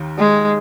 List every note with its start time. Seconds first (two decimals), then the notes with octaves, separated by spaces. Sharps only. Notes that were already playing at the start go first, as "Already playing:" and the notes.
Already playing: D#2 D#3
0.18 G#3